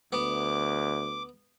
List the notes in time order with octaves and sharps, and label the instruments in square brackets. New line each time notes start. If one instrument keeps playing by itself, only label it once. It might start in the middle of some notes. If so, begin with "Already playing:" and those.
[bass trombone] D2 [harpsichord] B3 [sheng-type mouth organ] D6